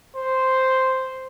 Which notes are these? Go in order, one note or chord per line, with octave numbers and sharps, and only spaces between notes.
C5